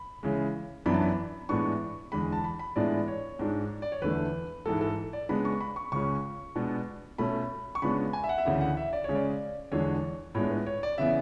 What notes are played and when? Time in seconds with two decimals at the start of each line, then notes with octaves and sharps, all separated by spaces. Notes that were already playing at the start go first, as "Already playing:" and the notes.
Already playing: B5
0.23 C#3 E3 G#3
0.86 F#2 E3 B3 D4 B5
0.94 A5
1.02 B5
1.49 A2 E3 G#3 B3 D4 C#6
2.12 E2 D3 G#3 B5
2.32 A5
2.44 B5
2.59 B5
2.76 A2 E3 G#3 B3 D4 D5
3.08 C#5
3.39 G#2 G#3 D4
3.82 D5
3.92 C#5
4.02 E2 D3 A3 B4
4.65 G#2 E3 G#3 A4
4.81 A4
5.13 D5
5.29 C#3 G#3 B3 D4 B5
5.45 C#6
5.61 B5
5.76 C#6
5.92 C#2 C#3 G#3 C#4 C#6
6.55 B2 G#3 B3 D4
7.18 B2 A3 C#4 B5
7.75 C#6
7.82 C#3 G#3 B3 D4 B5
8.13 G#5
8.24 E5
8.29 F#5
8.38 E5
8.45 D2 C#3 E3 F#5
8.61 F#5
8.77 E5
8.93 D5
9.04 C#3 G#3 C#4 C#5
9.15 D5
9.72 E2 D3 G#3 D4 C#5
10.35 A2 G#3 B3 D4 C#5
10.50 B4
10.67 C#5
10.83 D5
10.98 C#3 E3 B3 E5